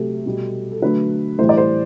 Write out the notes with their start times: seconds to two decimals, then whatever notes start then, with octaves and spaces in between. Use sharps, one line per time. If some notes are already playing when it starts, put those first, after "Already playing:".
Already playing: C3 F#3 A3 G4 A4
0.26 B2 G3
0.72 A4
0.82 D3 F#3 A3 B4
1.38 A2 E3 G3 C5
1.49 D5
1.57 C5